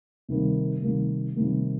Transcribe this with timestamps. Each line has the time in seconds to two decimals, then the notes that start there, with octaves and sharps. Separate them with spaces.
0.29 C3 D#3 G3 A#3
0.82 C3 D#3 G3 A#3
1.36 C3 D#3 G3 A#3